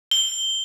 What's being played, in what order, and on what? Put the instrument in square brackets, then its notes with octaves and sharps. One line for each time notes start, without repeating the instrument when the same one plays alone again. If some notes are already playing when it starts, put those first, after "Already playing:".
[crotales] G7